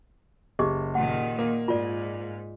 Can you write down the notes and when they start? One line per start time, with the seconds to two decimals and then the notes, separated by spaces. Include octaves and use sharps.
0.59 F#1 G4 G#4 D#5
0.95 A#2 D#3 F#5
1.39 A#3
1.68 G#2 F4 D5